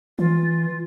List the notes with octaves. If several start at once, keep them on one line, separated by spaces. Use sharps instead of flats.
E3 F4